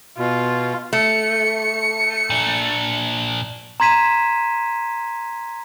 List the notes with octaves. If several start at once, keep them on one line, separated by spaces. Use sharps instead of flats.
B2 F4
A3 C#7
A#2 D4
A#5 C6 G#6 B6 D#7 E7